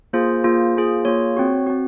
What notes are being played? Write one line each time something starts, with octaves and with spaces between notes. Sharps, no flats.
A#3 F4 G#4 C5
A#3 F4 G#4
A#3 F4 G#4
A#3 F4 G#4 C#5
C4 F#4
C4 F#4